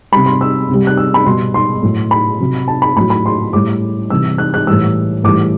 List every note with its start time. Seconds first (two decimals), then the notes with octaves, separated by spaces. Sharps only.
0.12 C3 G3 B5
0.26 C6
0.41 E6
0.69 C3 G3
0.87 F#6
0.97 E6
1.14 B5
1.26 B2 G3 C6
1.54 C6
1.83 A2 F#3
2.11 B5
2.40 C3 F#3
2.68 A5
2.82 B5
2.96 A2 F#3 B5
3.10 B5
3.26 C6
3.53 A2 G3 D6
4.10 C3 E3 G3 E6
4.38 F#6
4.54 F#6
4.67 A2 E3 G3 E6
5.24 A2 E3 G3 D6